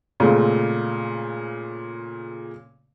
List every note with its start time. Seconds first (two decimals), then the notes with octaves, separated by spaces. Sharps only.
0.20 A#2 C#3 G#3 A3 C4